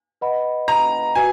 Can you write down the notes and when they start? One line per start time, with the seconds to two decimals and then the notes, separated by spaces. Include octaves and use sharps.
0.21 B4 D#5 F#5 B5
0.68 A#5
1.15 F#4 B4 G#5